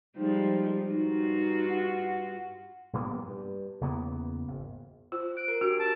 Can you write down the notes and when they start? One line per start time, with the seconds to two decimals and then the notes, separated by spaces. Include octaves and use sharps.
0.17 F3 G3 G#3 D#4
0.90 G2 D#4 F4 F#4
1.70 F#5
2.93 A#1 G2 A#3 B3
3.28 G2
3.81 E2 C#3 A#3 B3
4.48 G#1
5.12 F4 C5
5.37 F#6 D7
5.48 A#4
5.61 D4 F#4 G4
5.79 A5